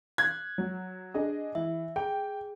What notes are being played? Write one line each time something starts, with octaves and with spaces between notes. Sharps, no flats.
F#6 G#6
F#3
D4 G#4 D#5
E3 E5
G#4 G5